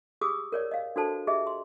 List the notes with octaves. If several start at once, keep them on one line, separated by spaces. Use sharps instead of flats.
G4 G#4 D#6 E6
A#4 C#5 D5
D#5 F5
D4 F#4 A4 C5 A5
G4 G#4 D#5 E5
C6